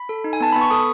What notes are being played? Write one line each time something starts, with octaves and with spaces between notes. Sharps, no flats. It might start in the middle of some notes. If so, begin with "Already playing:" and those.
Already playing: B5
A4
D#4
G#5
B3 A5
B3 B5
C#6
A4 D#6